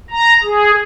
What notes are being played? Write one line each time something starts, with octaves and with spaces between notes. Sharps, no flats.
A#5
G#4